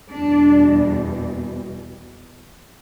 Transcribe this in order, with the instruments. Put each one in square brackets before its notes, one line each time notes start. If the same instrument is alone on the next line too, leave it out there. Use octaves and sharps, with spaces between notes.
[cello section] E2 B2 G3 D4